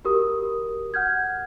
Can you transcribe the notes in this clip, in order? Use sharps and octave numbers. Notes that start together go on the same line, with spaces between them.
F#4 G4 A#4 D#6
F#5 F6 G6 G#6